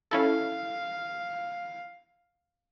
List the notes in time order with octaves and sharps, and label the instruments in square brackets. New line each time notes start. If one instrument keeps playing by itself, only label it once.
[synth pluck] C#4 E4 A4 [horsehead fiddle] F5